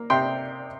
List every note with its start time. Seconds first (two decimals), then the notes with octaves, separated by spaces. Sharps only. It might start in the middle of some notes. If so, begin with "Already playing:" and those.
Already playing: A#3
0.10 C3 G5 C6